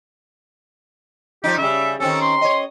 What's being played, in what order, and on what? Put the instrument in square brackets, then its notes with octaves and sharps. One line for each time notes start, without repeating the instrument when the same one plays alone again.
[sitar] F3 G3 D#4 [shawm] G4
[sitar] C#3 G3 [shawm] E5
[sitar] D#3 C4 C#4 [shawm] A4
[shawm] C6
[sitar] C#5 D#5